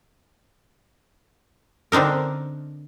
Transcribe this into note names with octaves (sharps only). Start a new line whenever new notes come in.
D3 C4 D4 D#4 A#4